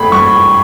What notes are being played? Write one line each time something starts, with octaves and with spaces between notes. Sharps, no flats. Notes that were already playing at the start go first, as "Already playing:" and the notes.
Already playing: G#1 A3 B5
G2 C#6